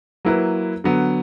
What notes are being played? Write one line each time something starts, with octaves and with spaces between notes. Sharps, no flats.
F#3 A#3 E4 B4
D3 F#3 B3